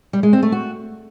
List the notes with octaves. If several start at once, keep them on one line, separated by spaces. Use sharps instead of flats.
G3
G#3
C4
A3
F#4